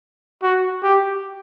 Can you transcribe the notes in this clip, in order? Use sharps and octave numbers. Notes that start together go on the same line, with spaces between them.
F#4
G4